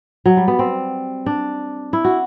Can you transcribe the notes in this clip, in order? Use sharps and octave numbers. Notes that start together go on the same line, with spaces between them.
F#3
G3
B3
C4
D4
E4
F#4